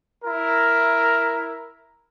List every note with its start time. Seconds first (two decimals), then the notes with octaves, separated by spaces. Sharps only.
0.24 E4 A#4